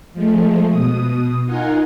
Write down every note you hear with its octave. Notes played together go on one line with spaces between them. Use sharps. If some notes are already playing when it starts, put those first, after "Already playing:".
F3 G#3 A3
B2 D#6
D#4 F4 A#4 F#5 G#5